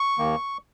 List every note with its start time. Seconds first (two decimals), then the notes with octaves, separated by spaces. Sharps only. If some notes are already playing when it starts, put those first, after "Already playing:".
Already playing: C#6
0.19 D#2 D#3 A#3